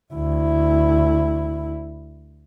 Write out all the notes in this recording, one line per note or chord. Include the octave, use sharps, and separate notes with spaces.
D2 E4